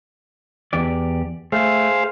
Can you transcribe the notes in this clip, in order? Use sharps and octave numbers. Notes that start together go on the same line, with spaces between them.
E2 G4 D5
A3 G#4 C5 F5